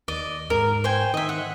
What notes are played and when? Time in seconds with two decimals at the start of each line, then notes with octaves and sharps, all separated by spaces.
0.08 D#2 D5 D#5
0.50 G#2 A#4
0.84 C5 G5 G#5
1.14 D#3 D#5 E5
1.29 F#5